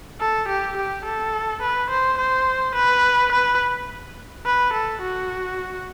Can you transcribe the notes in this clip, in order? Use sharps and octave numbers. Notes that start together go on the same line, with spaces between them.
A4
G4
G4
A4
B4
C5
C5
B4
B4
B4
A4
F#4